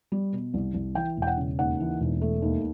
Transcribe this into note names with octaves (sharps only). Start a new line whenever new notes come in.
G3
B2
C2
C2
E3 G5
E1
G5
F#5
C#3
D#2 F#5
E3
E1
A3
D#2